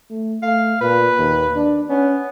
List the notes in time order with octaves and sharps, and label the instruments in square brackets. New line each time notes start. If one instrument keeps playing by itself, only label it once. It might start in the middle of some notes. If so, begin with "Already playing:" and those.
[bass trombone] A3
[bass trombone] A3 [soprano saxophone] F5
[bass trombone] A#2 [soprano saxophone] B4
[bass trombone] D#2
D4
[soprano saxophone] B3 [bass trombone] C#4